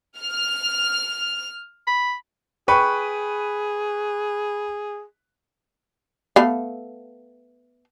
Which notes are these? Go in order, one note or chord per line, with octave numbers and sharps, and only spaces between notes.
F6
B5
G#4 B4 G5 C#6
A3 B3 F5